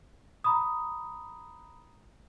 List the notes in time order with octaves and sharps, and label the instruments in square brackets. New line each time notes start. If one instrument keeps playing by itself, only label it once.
[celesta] A#5 B5 D#6